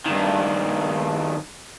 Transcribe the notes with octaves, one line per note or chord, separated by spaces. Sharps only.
G2 D#3